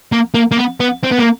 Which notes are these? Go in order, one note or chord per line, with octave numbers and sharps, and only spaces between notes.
A#3
A#3
A#3
B3
B3
C4
B3
A#3